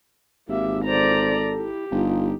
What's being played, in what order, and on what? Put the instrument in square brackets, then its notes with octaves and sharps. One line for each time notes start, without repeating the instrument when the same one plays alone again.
[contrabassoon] G#1 [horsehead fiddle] A#3 E5 [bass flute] G4
[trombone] A4 [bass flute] C5 [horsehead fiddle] D5 A#5
[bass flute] E4 [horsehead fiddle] G4
[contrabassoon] G1 [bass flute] D#4 [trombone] F4